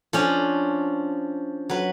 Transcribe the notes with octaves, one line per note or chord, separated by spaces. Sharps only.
F3 C#4 D4
F#3 B4